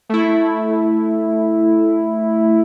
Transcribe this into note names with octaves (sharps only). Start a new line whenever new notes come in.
A3 E4